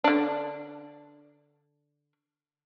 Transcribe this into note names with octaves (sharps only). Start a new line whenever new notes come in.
D3 D4